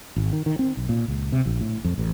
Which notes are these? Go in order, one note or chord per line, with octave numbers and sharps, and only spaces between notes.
G#1
D#3
D#3
C4
B1
A#2
C#2
C3
A#1
A2
F2
A1